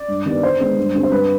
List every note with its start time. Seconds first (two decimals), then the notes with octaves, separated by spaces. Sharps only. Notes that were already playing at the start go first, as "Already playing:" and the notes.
Already playing: D5
0.08 G2
0.26 D#3 G3 B3
0.43 D3 C5
0.60 G#3 B3 D4
0.77 G2
0.94 D3 G3 C4
1.03 C5
1.12 G2 B4